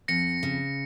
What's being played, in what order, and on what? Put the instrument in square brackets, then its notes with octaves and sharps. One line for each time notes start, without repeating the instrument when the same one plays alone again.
[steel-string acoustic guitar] F2 [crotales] A#6 C#7
[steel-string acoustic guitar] C#3